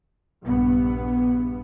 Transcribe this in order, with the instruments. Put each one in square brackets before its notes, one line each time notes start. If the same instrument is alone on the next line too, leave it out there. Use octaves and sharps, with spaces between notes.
[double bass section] A#1 G2 B3